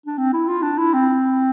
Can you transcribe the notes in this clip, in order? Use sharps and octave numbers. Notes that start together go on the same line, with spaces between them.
D4
C4
E4
F4
D4
E4
C4